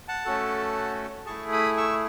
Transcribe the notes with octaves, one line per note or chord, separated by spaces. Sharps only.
F#5 A5
A3 C#4 F#4 A4
A3 E4 G#4 A5 C#6
B5 D#6
C#6 E6